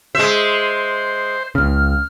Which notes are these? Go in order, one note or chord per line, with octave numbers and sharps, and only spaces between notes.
G#3 C5 E5
C#2 C#3 F6